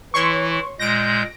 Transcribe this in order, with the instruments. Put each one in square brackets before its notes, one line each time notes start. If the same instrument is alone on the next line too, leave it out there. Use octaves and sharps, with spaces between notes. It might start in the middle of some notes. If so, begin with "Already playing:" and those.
[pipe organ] E3 E4 [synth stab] C#5 C6 C#6
[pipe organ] A#2 G#3 G6 [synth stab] A#6 D7